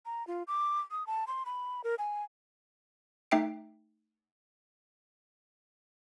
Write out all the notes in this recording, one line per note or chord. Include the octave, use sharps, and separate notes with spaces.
A#5
F4
D6
D#6
A5
C6
B5
A#4
G#5
A3 D#4 E5 G5 C7 D7